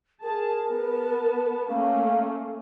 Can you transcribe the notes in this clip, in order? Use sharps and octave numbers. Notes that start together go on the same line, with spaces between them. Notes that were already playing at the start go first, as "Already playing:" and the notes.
G#4 A#4 A5
B3 A5
A3 A#3 C#4 F5